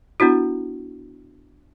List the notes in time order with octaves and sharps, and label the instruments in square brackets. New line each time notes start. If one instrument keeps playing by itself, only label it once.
[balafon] B3 D4 E4 F#4